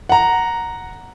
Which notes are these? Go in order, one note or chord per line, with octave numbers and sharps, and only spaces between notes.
F#5 A#5